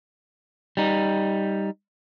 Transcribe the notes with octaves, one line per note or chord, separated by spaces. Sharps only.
G3 D#4